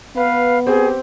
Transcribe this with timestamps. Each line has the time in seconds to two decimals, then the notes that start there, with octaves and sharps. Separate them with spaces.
0.16 B3 B4 F5
0.67 C4 G4 G#4